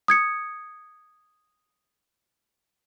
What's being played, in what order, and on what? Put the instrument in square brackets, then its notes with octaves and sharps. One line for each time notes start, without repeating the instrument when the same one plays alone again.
[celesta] D#6 G#6 C#7